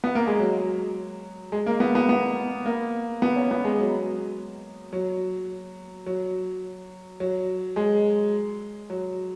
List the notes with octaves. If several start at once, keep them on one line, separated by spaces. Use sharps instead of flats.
B3
A#3
G#3
F#3
G#3
A#3
B3
B3
B3
A#3
B3
C#4
B3
G#3
F#3
F#3
F#3
F#3
G#3
F#3